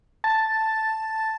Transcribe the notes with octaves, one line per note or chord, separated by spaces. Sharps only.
A5 A6